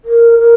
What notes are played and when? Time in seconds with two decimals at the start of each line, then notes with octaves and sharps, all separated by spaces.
0.05 A#4
0.39 A#4